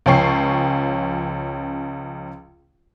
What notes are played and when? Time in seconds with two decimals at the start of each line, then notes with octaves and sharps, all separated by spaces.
0.06 C#2 F3 C#4 G5 C#6 C7